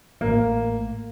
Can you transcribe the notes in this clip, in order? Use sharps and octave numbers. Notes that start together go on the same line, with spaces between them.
A1 A#3